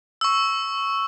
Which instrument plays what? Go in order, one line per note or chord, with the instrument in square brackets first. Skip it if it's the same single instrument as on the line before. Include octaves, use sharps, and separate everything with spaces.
[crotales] C#6 E6